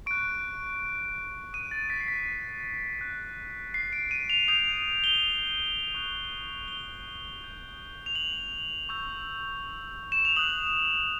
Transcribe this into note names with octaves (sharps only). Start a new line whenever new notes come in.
C#6 F#6 D7
D#6 F#6 D#7
A6
B6
C7
B6
C#6 F#6
C7
D7
D#7
F7
D#6 G6 F7
G7
C#6 F#6
G7
D#6 G6
F7
F#7
C#6 E6 G6
E7
F7
D#6 F#6 F#7